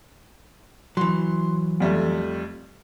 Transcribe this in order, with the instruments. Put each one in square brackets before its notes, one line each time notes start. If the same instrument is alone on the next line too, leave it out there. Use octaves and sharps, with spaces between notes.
[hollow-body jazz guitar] E3 F#3 [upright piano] C6
[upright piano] F2 G3 A3